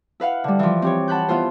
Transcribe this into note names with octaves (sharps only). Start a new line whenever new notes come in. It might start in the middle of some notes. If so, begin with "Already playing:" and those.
E4 B4 F5 F#5
D3 G3
E3 F3
C4 G4 C#5
F#5 A5 B5 F#6 G6
B3 E4 F4 C5